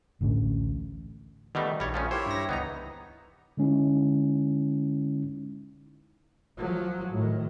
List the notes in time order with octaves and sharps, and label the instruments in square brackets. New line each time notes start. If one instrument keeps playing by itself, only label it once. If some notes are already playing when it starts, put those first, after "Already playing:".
[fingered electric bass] A1 D2 A2 C#4
[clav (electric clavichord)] B2 G3 A3 [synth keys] D#3 D#4
[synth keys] A#1 [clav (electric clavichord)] G3 C#5
[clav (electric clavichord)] F3 A3 C#4
[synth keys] A#3 [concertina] E4 G4 C#5 [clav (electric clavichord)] C5
[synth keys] G2 A#6
[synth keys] C#2 E3 A#5 [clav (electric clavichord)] B3 D#4
[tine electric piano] D3 G#3 C#4 D#4 E4
[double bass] F3 F#3
A2 D#3